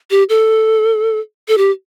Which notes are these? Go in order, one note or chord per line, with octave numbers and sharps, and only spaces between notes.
G4
A4
A4
G4